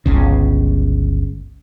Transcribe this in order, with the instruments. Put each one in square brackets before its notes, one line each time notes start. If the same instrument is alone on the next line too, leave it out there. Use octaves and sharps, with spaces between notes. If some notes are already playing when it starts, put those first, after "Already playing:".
[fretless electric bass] G1 C#2 C#3